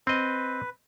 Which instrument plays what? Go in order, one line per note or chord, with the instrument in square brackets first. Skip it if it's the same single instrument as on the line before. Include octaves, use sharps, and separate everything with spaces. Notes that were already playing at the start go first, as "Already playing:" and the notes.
[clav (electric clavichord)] C4 D#5 [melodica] B4